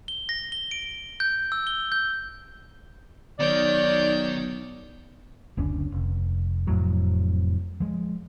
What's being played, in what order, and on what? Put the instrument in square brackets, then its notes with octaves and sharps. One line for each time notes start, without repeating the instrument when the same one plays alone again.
[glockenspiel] G7
A#6
G7
D7
G6
E6
G7
G6
[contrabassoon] B1 [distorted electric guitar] D#3 [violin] C#5 G6 [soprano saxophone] D5
[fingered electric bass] F#1 D2 C#4 D4
F1
F1 F2 A2 F#3
F3 G#3